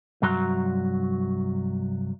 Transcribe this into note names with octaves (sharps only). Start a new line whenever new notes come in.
C2 G2 F#3 F#4 A#5 C6